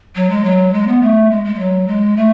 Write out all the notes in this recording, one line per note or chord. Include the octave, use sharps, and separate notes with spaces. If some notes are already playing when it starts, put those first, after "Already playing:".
F#3
G#3
F#3
G#3
B3
A3
G#3
G#3
G#3
F#3
G#3
A3